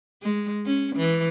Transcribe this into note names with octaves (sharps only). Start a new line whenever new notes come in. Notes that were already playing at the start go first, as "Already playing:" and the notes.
G#3
C#4
E3